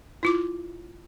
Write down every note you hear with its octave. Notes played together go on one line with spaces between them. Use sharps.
E4 F4 D6